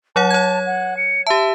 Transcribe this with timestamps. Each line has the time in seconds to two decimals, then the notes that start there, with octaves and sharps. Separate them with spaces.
0.16 F#3 C#5 F#5 A5
0.31 C#5 G#6
0.66 F#5
0.97 C#7
1.27 G4 E5 A5